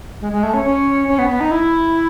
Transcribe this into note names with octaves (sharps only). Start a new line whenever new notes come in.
G#3
G#3
A3
C#4
C#4
C#4
B3
B3
D#4
E4